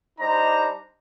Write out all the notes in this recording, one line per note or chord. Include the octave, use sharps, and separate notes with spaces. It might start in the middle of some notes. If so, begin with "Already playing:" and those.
G3 D4 D#4 C5 D#5 A#5